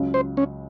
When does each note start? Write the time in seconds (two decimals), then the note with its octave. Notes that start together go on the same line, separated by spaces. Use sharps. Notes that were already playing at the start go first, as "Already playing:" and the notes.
Already playing: C#2 C#3 F#3
0.14 C5
0.37 C#4